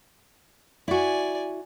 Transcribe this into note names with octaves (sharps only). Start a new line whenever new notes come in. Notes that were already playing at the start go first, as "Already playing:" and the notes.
E4 F#4 D5 G#5